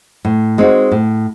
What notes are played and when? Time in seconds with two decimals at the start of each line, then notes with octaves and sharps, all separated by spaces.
0.25 A2
0.58 G#3 C4 D#4 F#4
0.91 A2